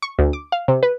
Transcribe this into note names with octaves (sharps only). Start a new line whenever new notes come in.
C#6
D2
D6
F5
C3
B4